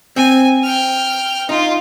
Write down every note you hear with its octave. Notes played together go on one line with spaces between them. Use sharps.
C4 G#5
G5 F6
D#4 F4